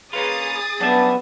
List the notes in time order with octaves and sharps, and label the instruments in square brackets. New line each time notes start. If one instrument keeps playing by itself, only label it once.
[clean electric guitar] A#3 C#4 F4 [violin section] G#4 D#6 A6 [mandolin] B4
[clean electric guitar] F#2 G3 E5 [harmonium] B3 [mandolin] D4 A5